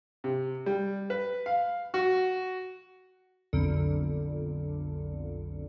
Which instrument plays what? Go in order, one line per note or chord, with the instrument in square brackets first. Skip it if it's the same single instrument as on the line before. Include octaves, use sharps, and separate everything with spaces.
[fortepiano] C3
G3
B4
F5
F#4
[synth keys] B1 F2 D3